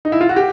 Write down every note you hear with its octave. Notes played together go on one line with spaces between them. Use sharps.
D#4
E4
F4
F#4
G4